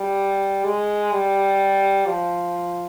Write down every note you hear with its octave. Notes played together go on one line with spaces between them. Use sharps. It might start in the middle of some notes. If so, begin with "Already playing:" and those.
Already playing: G3
G#3
G3
F3